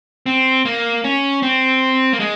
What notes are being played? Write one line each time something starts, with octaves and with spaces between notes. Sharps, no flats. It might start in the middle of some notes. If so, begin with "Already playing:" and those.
C4
A#3
C#4
C4
A#3
G#3